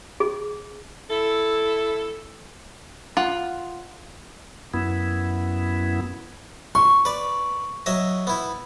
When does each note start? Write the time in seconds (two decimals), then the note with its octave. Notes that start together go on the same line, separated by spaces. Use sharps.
0.20 G#4
1.10 E4 A4
3.17 F4 F#5
4.74 F#2 B3 E4
6.75 C6 C#6
7.05 B4 D5
7.86 F#3 D#5 E5
8.27 B3 E4